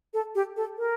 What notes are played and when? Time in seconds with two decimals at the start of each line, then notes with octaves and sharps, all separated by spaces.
0.14 A4
0.35 G4
0.56 A4
0.78 A#4